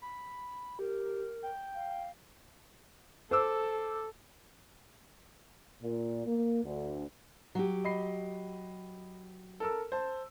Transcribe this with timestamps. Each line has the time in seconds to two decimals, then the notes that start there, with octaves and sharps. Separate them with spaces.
0.02 B5
0.79 G4 A#4
1.43 G5
1.75 F5
3.31 A4 C5 D6 E6
5.82 A#2
6.25 A#3
6.64 D2
7.55 F#3 G4
7.85 D#5 B5 C7
9.60 A4 A#4 E6
9.92 C5 A5